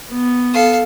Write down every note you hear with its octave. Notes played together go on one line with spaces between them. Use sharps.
B3
A4 F5